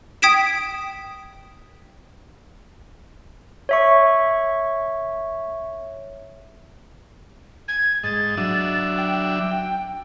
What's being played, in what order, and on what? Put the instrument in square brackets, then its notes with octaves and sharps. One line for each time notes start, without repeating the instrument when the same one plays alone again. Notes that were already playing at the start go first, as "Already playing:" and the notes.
[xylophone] G5 D#6 G#6 B6 D7 E7
[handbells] C#5 E5 C#6
[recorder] G#6
[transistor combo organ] G#2 D#5 [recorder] A6
[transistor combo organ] F#3 D4 E5
[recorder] G5